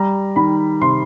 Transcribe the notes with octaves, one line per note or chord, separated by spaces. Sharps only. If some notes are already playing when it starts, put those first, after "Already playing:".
Already playing: G3 A#5
D#3 B5
C3 C6